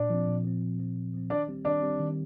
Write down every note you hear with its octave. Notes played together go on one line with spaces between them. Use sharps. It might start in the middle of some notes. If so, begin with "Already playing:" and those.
Already playing: A#2 D4 D5
F3 C4
A#2
F3 C4
A#2
F3 C4
A#2
F3 C4
D#3 D4 D5
G3 C4 G4
D#3 D4 D5
G3 C4 G4
D#3